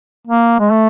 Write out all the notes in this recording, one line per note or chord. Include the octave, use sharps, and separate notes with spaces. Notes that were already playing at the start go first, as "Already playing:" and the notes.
A#3
G#3
A3